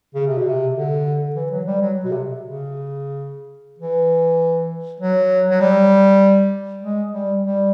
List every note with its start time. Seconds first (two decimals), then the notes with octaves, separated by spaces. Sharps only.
0.14 C#3
0.26 C3
0.38 B2
0.48 C3
0.75 D3
1.35 E3
1.51 F#3
1.66 G3
1.81 F#3
2.04 B2
2.11 C3
2.43 C#3
3.78 E3
5.00 F#3
5.50 F#3
5.60 G3
6.82 G#3
7.12 G3
7.43 G3